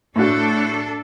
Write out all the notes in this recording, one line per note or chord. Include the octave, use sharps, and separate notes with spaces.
A2 D4 F#4 A4